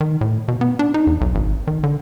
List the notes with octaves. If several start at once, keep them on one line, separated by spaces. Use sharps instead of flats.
D#3
A2
B2
B3
D4
D#4
E2
B1
G#1
D#3
D3